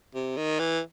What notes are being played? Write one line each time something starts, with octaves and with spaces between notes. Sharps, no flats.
C3
D#3
E3